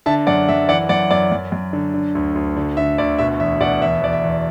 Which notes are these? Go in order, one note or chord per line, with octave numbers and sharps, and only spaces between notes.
D3 E5 A5
F#2 D5 F#5
F#2 E5
E3 D5 F#5
F#2 D5 F#5
F#2 D5
F#2
F#2
D3
D3
D2
D2
D3
D3 E5
D2 D5
B2 E5
E2 E5
B2 D5 F#5
E2 E5
E2 D5
E5
E2